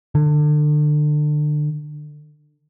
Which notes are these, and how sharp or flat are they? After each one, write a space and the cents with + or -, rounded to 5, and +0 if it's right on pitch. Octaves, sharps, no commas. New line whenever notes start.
D3 +30